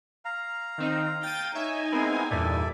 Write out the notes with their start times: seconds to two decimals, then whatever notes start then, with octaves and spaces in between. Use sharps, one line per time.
0.25 F5 A#5
0.78 D#3 C4 D#4
1.23 G5 A6 D#7
1.55 D#4 C#5 E5 G#5
1.92 G#3 B3 C4 E4 G#4 A#4
2.31 E2 G2 A#2 A4 D5 E5